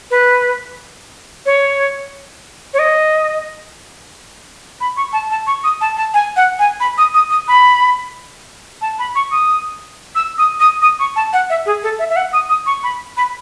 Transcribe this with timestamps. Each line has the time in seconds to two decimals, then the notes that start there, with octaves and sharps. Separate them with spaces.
0.11 B4
1.46 C#5
2.74 C#5
2.79 D#5
4.81 B5
4.97 C#6
5.13 A5
5.30 A5
5.47 C#6
5.64 D#6
5.81 A5
5.97 A5
6.14 G#5
6.36 F#5
6.59 G#5
6.80 B5
6.98 D#6
7.14 D#6
7.30 D#6
7.48 B5
8.82 A5
8.99 B5
9.15 C#6
9.31 D#6
10.15 E6
10.38 D#6
10.60 D#6
10.82 D#6
11.00 C#6
11.16 A5
11.33 F#5
11.50 E5
11.66 G#4
11.83 A4
11.99 E5
12.10 E5
12.16 F#5
12.33 D#6
12.49 D#6
12.66 C#6
12.84 B5
13.17 B5